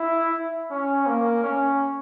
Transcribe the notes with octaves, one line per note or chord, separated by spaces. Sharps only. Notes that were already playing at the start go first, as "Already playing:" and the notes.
Already playing: E4
C#4
A#3
C#4